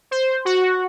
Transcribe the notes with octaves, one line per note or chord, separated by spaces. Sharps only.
C5
F#4